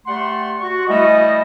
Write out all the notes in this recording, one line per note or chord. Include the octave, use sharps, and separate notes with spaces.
G3 A3 F#5 C6
F#4 C#6
E3 G3 A3 D#5